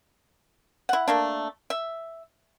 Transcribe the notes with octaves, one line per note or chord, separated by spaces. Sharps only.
E4 F#5
A3 A#3 D4
E5